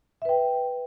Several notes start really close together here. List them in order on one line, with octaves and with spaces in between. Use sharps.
E5 B4 G5